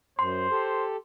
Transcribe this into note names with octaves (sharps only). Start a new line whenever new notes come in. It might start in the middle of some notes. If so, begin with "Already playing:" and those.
F#2 C5 C6
G4 A4